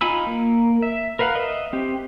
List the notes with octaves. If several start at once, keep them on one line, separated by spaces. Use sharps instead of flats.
D#4 F4 G#5 B5 E6
A#3
E5
A#4 B4 F5 F#5
D#5 E5
C4 G4